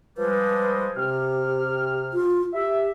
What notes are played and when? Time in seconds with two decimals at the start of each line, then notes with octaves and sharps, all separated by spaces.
0.18 F3 G3 G#3 B4
0.97 C3 G4 F6
2.13 F4
2.54 G4 E5